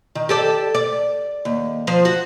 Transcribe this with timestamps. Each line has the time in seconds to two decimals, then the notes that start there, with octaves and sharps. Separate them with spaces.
0.15 D#3
0.29 G4 A4 D5
0.75 D5
1.45 D#2
1.87 F3 C5
2.05 F#4